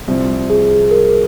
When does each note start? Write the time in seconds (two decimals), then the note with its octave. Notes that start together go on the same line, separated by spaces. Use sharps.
0.08 C2 C3 F3 C4
0.50 G#4
0.91 A#4